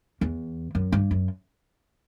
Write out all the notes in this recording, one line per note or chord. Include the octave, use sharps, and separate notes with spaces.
E2
F#2
G2
F#2